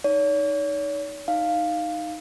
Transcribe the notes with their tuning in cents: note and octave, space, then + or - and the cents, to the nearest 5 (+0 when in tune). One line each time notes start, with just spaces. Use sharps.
D#4 +0 C#5 +40
D#4 +0 F5 +0